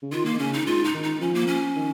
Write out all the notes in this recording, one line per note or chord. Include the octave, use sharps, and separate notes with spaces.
C#3
D#3 F4
A#3
D#3
C#3 C#4
D#4
G#2 F4
D#4
D#3
D#4
F3 C#4
A#3
C#4
D#3